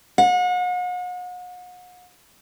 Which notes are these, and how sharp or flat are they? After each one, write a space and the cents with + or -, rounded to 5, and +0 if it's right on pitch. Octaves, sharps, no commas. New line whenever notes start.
F#5 -40